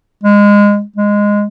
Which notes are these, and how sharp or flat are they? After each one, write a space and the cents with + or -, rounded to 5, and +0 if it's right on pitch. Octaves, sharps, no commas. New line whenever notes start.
G#3 -20
G#3 -10